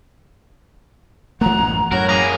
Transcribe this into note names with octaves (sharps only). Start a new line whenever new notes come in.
E3 G#3 A3 F#5 A#5
A1 F#2 A2
F#2 A2 F#4 A#4 C#5
A#3 G#4 A#5